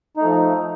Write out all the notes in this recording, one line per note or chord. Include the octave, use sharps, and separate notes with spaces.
F3 A3 D#4